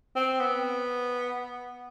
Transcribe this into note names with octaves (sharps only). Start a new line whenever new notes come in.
C4
B3